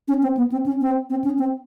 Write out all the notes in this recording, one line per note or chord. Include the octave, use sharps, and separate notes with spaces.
C#4
C4
B3
C4
C#4
C4
C4
C#4
C4